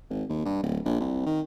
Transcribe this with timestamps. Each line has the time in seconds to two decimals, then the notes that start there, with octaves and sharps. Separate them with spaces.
0.10 G#1
0.29 D#2
0.45 G2
0.63 D1
0.85 A#1
1.00 C2
1.26 D#3